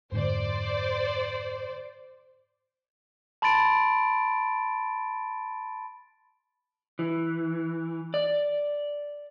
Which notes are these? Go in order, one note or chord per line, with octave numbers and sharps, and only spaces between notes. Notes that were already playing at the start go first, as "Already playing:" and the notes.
F2 G#2 D3 C5 D5
A5 B5 C6 A6 D7
E3
D5